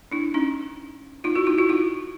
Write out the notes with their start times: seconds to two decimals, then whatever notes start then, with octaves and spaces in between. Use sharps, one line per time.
0.12 D4 E4
0.34 C#4 D#4
1.24 D#4 F4
1.35 E4 F#4
1.47 D#4 F4
1.58 E4 F#4
1.69 D#4 F4